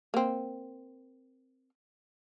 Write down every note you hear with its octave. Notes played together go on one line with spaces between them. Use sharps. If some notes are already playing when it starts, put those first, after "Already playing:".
A#3 C4